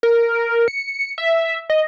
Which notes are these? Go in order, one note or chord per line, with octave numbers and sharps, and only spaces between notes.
A#4
C#7
E5
D#5